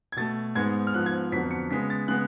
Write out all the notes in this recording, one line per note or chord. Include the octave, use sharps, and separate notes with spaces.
G#6
B2 A3 A6
G#2 G#3 B3 G#6
F6
G#2 F3 B3 F#6
G#6
F2 D3 F#3 B3 B6
C#7
C#3 G#3 B3 B6
A6
C#3 G#3 B3 F#6